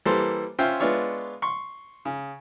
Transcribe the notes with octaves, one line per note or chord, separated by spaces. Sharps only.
E3 G3 A#3 A4 C5
C#4 F4 C5 E5 G5 C6
G#3 B3 D4 F4 C#5 E5
C6 C#6
C#3